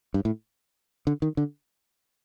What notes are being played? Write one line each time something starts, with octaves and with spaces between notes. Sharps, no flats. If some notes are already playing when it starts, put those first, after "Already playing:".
G2
A2
D3
D#3
D3